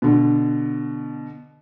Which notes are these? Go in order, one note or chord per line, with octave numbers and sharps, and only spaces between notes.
B2 D3